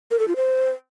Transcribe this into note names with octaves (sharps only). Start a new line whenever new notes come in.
A#4
A4
F4
C5